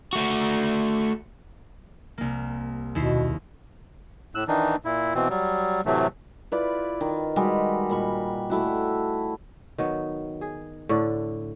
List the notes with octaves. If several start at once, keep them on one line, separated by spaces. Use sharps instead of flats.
A3 F#4
C2 A#3
D#2 B2 E4 C7
A2 E6 F#6
D#3 E3 D4 D#4
A#2 E4
B2 E3 C4
F#3 G3
A2 C3 E3 F#3 A3
E4 F4 B4 D5
D#3
G3 G#3 F#4
A#2 B5 C#6
A3 E4 F#4
D#3 F#3 B3
G#4
A2 D3 D5